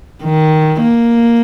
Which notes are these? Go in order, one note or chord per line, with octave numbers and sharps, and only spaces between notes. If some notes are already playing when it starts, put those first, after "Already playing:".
D#3
A#3